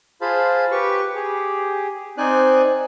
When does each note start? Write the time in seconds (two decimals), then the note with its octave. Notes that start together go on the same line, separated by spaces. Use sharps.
0.21 F4 G#4 C5 F5 A5 B5
0.72 G4 B4 C#6
1.15 G4 G#4
2.18 C4 D#4 C5 D5 G#5 F#6